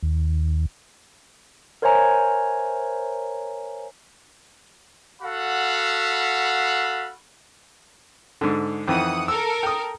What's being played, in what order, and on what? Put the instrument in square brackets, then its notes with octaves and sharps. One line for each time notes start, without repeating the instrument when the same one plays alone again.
[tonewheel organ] D#2
[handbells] A#4 C5 C#5 E5 G#5 A#5
[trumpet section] F#4 A4 F5 F#5 B5
[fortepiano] G#2 D3
[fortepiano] F2 D#3 E3 [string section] F#5 D#6
[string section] A4 A#4 [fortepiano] E6
[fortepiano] G5 D#6